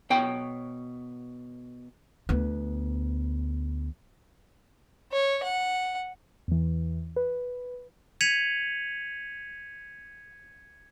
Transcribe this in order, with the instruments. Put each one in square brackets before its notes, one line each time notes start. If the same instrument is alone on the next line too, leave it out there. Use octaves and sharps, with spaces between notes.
[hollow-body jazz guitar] B2 C#5 G5
[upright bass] D2 B3
[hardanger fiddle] C#5
F#5
[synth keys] E2 E3
B4
[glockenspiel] G#6 B6 C#7 D#7 F7 F#7